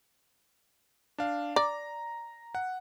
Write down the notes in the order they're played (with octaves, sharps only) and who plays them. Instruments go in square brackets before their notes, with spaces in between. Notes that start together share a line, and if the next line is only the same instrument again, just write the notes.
[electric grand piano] D4 F5
[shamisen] D5 [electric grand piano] A#5
[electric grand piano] F#5